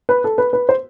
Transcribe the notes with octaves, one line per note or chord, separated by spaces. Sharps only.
B4
A4
B4
B4
C5